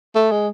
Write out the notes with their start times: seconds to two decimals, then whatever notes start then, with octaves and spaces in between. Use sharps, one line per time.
0.15 A3
0.31 G#3